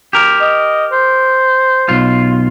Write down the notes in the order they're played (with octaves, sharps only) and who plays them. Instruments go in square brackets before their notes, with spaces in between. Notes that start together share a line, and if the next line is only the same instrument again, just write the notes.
[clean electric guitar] G4 A#4
[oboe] D#5
C5
[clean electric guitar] B1 F4